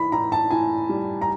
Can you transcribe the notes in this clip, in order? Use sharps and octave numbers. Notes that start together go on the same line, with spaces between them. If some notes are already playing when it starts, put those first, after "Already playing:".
Already playing: E3 B5
A2 A#5
A5
A2 G#5
G3
A#5